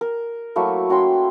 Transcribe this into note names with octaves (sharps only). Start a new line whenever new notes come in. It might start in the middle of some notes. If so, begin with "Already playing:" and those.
A#4
F#3 A3 A#3 E4
C#4 F#4 G5 C6